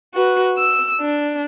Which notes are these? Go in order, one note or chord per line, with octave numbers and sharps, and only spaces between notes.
F#4 B4
E6
D4